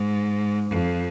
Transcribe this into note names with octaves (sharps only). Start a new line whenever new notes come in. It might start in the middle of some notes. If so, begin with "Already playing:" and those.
Already playing: G#2
F2